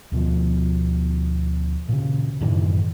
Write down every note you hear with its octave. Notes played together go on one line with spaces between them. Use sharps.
D2 B2 F3
A#2 C#3
F#2 A2 D#3 E3